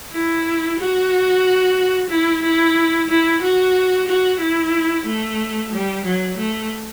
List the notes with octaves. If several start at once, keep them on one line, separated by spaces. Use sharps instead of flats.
E4
F#4
E4
E4
E4
F#4
F#4
E4
A3
G3
F#3
A3